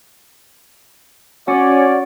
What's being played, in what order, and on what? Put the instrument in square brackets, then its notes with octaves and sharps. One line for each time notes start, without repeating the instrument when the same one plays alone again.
[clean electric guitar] C#4 [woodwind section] F#4 C#5 D5